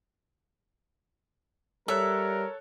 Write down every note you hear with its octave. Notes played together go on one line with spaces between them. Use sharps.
G3 A4 A#4 C#5 E5 F#6